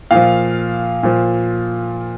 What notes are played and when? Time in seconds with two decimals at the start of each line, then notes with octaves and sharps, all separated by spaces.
0.11 A#2 F3 F5
1.03 A#2 F3